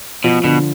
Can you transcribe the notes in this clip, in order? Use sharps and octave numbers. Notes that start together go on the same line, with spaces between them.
B2 F3
B2 D3